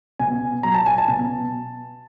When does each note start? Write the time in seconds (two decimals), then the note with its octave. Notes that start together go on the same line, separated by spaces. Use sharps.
0.19 B2 G#5
0.63 F#3 A#5
0.74 A5
0.86 G#5
0.98 A5
1.08 B2